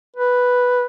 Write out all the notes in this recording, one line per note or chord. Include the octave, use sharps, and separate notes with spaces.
B4